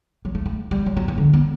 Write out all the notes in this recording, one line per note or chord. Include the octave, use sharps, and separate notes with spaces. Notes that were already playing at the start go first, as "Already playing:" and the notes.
F#3
A3
A3
G3
F#3
F#3
E3
D3
B3